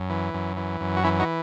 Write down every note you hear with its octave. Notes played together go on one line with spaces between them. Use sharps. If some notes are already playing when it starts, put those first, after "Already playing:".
Already playing: F#2
E3
F#2
E3
F#2
F#4
E3 C#4 E4
D#4 F#4